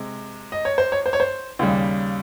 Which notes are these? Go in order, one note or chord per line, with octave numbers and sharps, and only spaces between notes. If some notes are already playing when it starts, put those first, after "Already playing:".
Already playing: C3 G#3
D#5
C#5
C5
C#5
C5
C#5
C5
D#2 C#3 G3